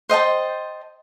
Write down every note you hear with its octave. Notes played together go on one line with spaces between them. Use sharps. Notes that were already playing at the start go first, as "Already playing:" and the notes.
C5 D#5 G5 A5